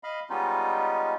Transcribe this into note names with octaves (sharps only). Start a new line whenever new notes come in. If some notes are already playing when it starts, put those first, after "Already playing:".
D#5 F5 B5
G3 G#3 B3 C#4 D#4 F4